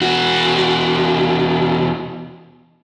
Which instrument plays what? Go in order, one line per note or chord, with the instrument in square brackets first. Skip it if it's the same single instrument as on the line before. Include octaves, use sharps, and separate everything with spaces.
[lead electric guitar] E2 F#4